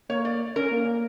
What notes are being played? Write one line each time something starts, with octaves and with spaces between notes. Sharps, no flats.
A#3 C#5
D5
C#4 A#4
A#3